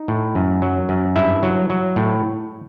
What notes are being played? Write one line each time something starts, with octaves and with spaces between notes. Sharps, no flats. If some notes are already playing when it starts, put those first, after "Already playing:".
Already playing: D#4
A2
F#2
F#3
F#2
G2 E4 E5
F#3
F#3
A2